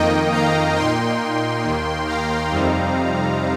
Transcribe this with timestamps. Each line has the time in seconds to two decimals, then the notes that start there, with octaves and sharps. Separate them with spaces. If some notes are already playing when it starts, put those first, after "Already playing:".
Already playing: F2 D#3 A#3 D#4 D#5 G5
0.32 F5 A#5
0.76 A#2 A#3 D#4 G5 C6
1.63 D#2 D#3 A#3
2.07 F5 A#5
2.51 F2 C3 G3 C4 D#4